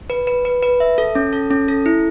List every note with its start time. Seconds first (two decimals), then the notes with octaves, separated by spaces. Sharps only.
0.10 B4
0.27 B4
0.45 B4
0.62 B4
0.80 E5
0.98 A4
1.15 C#4
1.33 A4
1.51 C#4
1.68 A4
1.86 E4